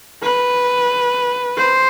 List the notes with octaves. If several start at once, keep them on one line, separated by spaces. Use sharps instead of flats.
B4
C5